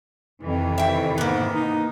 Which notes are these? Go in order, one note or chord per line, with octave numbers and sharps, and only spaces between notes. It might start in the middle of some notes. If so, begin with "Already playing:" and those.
F2 C3 D#3 E3
E5 G5
G#2 A#3 B3
D#4